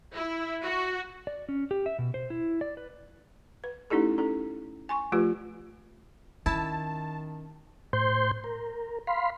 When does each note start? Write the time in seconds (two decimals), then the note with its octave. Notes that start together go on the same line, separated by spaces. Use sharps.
0.14 E4
0.63 F#4
1.27 D5
1.49 C#4
1.71 G4
1.86 E5
1.99 B2
2.14 C5
2.30 E4
2.61 D5
2.77 B4
3.64 B4
3.90 A3 C#4 D#4 E4 G4 A4
4.18 C#4 A4
4.89 G#5 C6 C#6
5.12 F3 A3 F4 G4 B4
6.46 D#3 C#4 E4 A5
7.93 A2 C5 C6 G6
8.44 A#4
9.07 F5 B5 C6